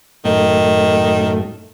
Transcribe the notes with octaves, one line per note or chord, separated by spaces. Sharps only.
F#2 A2 D#3 A3